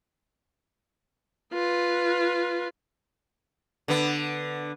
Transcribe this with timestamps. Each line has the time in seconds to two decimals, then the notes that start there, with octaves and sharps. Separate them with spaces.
1.53 F4 B4
3.88 D3 B3